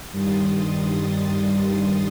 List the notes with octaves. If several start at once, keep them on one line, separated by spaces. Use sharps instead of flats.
G2 D#3 G3 C6 D#6 A6